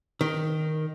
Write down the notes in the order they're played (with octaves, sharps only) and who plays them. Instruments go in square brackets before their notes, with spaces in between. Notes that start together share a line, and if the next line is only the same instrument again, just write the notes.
[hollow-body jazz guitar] D#3